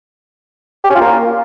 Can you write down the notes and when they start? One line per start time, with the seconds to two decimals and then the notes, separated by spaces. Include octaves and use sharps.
0.84 G4
0.90 C#4
0.95 F4
1.01 A#3